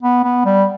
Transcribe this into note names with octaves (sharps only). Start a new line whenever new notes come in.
B3
B3
G3